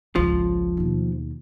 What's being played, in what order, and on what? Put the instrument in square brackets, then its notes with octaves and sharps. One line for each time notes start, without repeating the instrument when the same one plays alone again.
[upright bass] G#1 C#2 [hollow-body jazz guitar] F3
[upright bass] D#2 B2